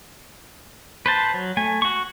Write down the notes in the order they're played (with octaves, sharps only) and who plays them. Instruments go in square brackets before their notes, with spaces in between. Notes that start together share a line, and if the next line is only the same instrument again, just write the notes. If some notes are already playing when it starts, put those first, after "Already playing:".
[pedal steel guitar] B4 C5 A5
F#3
A3 G#5
F#4 C#6